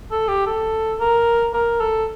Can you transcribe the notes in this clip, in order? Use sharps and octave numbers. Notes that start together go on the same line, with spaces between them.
A4
G4
A4
A#4
A#4
A4